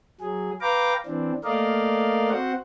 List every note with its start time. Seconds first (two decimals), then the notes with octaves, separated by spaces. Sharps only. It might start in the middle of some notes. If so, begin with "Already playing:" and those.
0.21 F#3 G#4
0.61 B4 F5 G5 A#5 D6
1.06 E3 C4 D4
1.44 A3 A#3 A#4 D5 D#5 F5
2.30 C4 F#4 C5 F#5